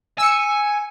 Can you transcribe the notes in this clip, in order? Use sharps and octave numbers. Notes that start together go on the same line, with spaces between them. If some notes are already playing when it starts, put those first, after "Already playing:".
G#5 E6 C#7